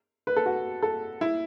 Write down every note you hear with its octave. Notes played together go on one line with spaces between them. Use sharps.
B4
A4
F#4
A4
E4